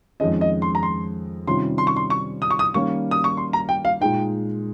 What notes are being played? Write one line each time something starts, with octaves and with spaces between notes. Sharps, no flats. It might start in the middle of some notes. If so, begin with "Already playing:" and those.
F2 D#3 G#3 C#4 D#5
D#5
C6
A#5
C6
C3 D#3 G3 C#4 F4 C6
C6
C#6
C6
C#6
D#6
C#6
D#6
D#3 G3 A#3 C#4 C#6
D#6
C#6
C6
A#5
G5
F5
A#2 G#3 D#4 G5